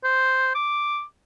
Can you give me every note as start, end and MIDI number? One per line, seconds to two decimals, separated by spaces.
0.04 0.53 72
0.55 1.03 86